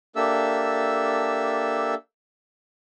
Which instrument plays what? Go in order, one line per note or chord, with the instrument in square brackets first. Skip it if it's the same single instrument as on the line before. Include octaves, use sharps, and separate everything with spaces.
[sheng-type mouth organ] A#3 D4 G4 A4 E5 E6